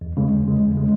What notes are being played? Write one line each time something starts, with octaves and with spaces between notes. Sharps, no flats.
E2
C#3 G#3
E2
C#3 G#3
E2
C#3 G#3